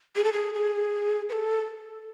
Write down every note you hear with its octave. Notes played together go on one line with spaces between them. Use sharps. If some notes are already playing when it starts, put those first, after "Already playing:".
G#4
A4
G#4
G#4
B4
A4